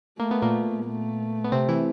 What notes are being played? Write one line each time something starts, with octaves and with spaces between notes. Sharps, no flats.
A3 A#3
B3
A#2 A#3
A3
B3
C3 C4
E3 E4